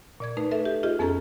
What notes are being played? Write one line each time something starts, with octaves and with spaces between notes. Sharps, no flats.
A#2 D5 G#6
A3 D#4 B4
A4 B4 E5
G4
F4 G4 G#4 D#5
F2 B3 C#4 G#4 A4 A#5